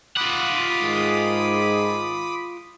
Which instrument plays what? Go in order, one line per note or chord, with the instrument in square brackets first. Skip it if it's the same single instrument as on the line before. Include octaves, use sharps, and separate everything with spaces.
[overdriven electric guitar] F4 F#5 [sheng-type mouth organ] B5 D6 D#6
[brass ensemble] G#2 D#3 G#4